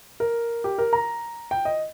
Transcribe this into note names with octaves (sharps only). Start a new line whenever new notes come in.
A#4
G4
A#4
A#5
G5
D#5